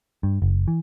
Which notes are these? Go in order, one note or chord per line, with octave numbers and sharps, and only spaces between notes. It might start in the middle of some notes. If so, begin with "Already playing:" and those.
G2
F#1
E3